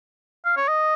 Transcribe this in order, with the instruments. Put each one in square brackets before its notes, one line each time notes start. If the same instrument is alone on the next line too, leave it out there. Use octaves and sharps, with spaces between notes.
[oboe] F5
C#5
D#5